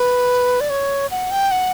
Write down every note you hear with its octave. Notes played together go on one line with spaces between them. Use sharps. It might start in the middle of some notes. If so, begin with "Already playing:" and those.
Already playing: B4
D5
C#5
F#5
G5
F#5